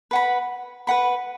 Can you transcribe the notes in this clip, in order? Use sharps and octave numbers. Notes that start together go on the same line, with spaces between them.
B4 F#5 B5
B4 F#5 B5